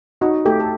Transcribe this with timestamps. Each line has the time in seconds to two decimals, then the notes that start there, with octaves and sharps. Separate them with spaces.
0.21 D#4 F#4
0.45 A3 G4
0.60 A4